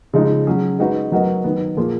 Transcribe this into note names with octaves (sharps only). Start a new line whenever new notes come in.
C#3 F3 G#3 D#4
F#3 C#4 G#4
G#3 D#4 F#4 B4 D#5
F#3 B3 F#4 A#4 D#5
D#3 F#3 B3
A#2 F3 A#3 F4 G#4